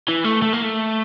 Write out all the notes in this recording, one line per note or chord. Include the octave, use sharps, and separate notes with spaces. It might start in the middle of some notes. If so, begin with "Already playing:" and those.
E3
A3
A3
A#3
A3